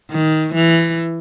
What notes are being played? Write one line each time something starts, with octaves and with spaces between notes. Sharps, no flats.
D#3
E3